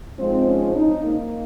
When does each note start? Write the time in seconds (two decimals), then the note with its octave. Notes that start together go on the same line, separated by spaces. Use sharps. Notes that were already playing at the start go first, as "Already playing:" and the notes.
0.19 G#2 F3 G#3 C4
0.47 C#4
0.75 D#4
1.04 A#3